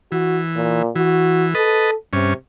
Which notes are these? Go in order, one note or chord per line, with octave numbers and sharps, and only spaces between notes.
E3 F#4
A#2
E3 F#4
A4 B4 D#5 A5
G2 C3 C#4